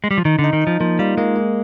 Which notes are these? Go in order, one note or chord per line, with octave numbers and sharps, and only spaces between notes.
G#3
G3
F3
D#3 D#4
D3
D#4
D#3
D#4
F3
F3 A#3
G3 F4
G#3 A#3
A#3